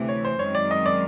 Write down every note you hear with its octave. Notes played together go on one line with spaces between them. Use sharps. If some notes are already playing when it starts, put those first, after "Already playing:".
Already playing: D2 C3 E3 A3
C#5
C5
F#2 D#3 G#3 C4 C#5
D5
D#5
D5